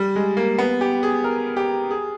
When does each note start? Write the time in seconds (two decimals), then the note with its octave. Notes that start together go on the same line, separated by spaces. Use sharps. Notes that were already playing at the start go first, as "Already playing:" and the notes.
Already playing: G3
0.16 G#3
0.37 A#3
0.58 B3
0.81 G4
1.03 G#4
1.24 A#4
1.57 G4
1.91 G#4